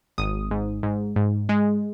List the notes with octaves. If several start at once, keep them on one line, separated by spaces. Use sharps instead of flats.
G#1 D#6
G#2
G#2
G#2
G#3